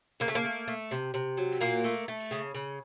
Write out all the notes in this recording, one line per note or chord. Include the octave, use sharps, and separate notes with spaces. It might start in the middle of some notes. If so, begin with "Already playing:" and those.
C#3 A#3
A3
A#3
A3
A3
C3
C3
F#3
A#2 A#3
A3
A3
C#3
C#3